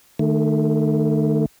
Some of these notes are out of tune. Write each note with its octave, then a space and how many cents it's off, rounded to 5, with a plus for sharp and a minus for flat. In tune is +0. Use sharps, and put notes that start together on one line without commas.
D#3 -35 A3 +0